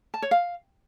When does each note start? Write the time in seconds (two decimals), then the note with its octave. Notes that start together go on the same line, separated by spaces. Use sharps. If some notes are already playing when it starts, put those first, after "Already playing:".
0.14 A5
0.22 C#5
0.31 F5